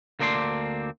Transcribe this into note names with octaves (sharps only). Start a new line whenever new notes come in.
D2 A#3 C4 D4 D5 C6